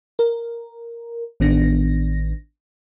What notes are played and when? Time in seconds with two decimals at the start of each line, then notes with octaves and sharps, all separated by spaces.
0.19 A#4
1.40 A1 D#3 B3 D4 A#6